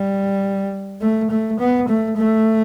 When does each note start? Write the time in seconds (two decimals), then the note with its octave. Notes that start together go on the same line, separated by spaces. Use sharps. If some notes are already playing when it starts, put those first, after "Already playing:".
Already playing: G3
1.01 A3
1.30 A3
1.60 B3
1.88 A3
2.17 A3